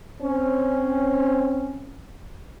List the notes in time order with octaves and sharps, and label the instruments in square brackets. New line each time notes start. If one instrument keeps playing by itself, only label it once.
[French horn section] C4 C#4